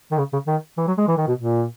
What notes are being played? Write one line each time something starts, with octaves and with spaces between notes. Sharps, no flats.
D#3
C#3
C#3
D#3
E3
F#3
G#3
E3
D#3
B2
A#2